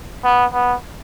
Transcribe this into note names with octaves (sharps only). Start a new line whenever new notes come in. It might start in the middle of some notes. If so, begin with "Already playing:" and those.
B3
B3